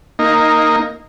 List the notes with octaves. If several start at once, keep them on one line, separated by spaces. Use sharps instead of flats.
A#3 D#4